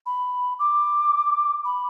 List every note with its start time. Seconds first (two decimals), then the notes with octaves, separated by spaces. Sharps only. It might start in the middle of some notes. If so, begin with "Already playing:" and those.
0.06 B5
0.59 D6
1.65 B5